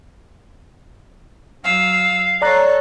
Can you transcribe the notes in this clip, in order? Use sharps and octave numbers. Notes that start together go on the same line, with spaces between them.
F#3 F5 E6
A4 C#5 D5 A#5 F#6